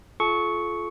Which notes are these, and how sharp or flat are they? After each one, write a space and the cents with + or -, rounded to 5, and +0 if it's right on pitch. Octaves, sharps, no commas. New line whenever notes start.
F4 -10 A4 -40 C#6 +0